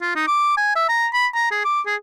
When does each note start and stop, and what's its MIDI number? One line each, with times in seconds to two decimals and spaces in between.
0.01 0.13 65
0.16 0.25 63
0.28 0.57 86
0.57 0.76 80
0.76 0.88 76
0.89 1.07 82
1.14 1.27 83
1.35 1.50 82
1.52 1.60 68
1.65 1.81 86
1.86 1.95 68